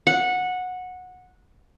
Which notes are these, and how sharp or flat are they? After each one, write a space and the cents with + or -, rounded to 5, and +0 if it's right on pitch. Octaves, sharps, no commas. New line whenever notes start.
F#5 -15